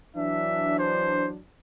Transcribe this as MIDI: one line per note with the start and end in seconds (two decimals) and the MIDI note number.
0.16 1.38 52
0.16 1.38 54
0.16 1.38 62
0.16 0.75 76
0.79 1.29 72